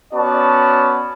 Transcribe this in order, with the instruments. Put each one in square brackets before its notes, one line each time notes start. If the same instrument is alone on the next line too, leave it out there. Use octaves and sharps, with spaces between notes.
[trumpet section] B3 C#4 F#4 D5 A5